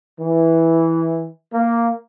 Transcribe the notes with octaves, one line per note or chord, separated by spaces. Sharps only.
E3
A#3